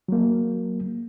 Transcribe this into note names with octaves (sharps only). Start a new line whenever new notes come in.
F#3 A#3